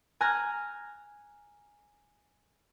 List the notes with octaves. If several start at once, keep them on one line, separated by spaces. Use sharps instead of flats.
G#5 A#5 F6 F#6 G#6 A#6